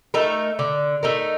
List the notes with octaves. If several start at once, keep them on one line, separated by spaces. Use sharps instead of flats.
A3 D#4 A#4
D3
A3 D#4 A#4